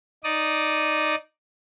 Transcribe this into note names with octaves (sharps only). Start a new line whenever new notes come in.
D#4 D5 D#6